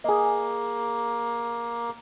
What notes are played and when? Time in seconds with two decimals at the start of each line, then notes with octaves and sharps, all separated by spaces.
0.04 A#3 G#4 D#5